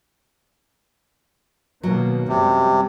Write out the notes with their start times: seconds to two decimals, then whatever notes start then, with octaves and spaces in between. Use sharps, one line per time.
1.83 B2 D#3 F#3 A#3
2.28 F#2 C3 G3 G#3